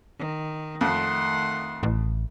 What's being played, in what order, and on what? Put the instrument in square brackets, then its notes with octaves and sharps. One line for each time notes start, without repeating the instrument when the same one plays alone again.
[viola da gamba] D#3
[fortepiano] F2 [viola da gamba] D#3 A3 [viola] F#5 C6
[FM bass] A1